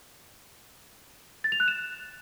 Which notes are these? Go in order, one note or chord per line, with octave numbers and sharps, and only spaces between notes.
A6
F7
F#6
E7